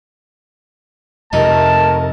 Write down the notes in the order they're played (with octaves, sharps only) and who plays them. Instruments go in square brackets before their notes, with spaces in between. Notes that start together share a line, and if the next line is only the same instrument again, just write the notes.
[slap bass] F2 C3 [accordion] A3 A#4 [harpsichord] D#4 [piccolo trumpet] A5